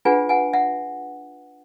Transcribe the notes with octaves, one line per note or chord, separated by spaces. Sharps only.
D4 F4 G#4 B4 F#5 G#5
F#5 G#5
E5 F#5